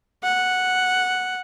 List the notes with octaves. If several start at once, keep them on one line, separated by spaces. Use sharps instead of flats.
F#5